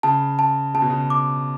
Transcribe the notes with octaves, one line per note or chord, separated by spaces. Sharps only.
C#3 A5
A5
C#3 A5
B2
C#3
D6